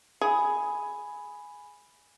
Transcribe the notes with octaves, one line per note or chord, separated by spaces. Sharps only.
G#4 G#5 B5